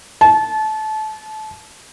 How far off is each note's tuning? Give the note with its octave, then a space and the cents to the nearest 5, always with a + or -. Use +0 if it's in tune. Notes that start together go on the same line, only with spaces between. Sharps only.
A5 -30